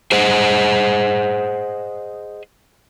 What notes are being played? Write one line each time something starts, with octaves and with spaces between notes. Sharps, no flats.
G#4 C5 D#5 F#5